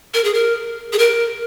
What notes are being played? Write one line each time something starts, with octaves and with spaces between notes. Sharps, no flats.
A#4
G#4
A#4
G#4
A#4